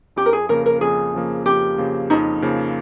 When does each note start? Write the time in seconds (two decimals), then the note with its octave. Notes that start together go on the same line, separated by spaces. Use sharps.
0.16 F2 G4
0.26 A#4
0.33 G#4
0.49 C#3 F3 A#3 A#4
0.66 A#4
0.81 F2 G#4
1.14 C#3 F3 A#3
1.45 F2 G4
1.78 C#3 F3 A#3
2.10 F2 D#4 D#5
2.42 C#3 F3 A#3